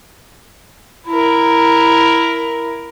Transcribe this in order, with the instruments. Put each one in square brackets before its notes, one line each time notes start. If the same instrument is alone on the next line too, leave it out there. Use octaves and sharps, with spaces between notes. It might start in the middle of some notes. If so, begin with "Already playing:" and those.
[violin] E4 A#4